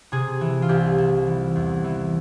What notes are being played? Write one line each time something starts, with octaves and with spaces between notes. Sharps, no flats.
C3 G#4
E3
F4
C2 G4
C2
E3
E2
E3